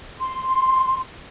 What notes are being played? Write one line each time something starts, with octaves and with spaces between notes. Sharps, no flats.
C6